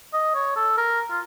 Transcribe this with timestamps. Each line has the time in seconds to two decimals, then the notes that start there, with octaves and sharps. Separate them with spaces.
0.13 D#5
0.35 C#5
0.56 A4
0.78 A#4
1.11 F4